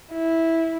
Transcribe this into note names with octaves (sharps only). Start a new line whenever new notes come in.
E4